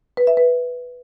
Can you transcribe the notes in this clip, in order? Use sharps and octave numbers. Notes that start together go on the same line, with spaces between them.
B4
E5
B4